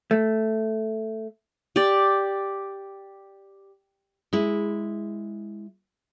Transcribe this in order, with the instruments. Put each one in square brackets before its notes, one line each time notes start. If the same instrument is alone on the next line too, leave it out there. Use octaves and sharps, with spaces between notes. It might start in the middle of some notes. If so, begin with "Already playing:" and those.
[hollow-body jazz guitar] A3
[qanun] G4 D5
[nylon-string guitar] G#3 E4